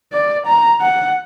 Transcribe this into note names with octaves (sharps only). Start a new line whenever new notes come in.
D5
A#5
F#5